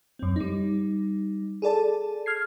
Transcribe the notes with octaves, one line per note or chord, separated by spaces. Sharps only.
F#2 C4
G3 D#4
G#4 A4 D5 A5
F6 G#6 C7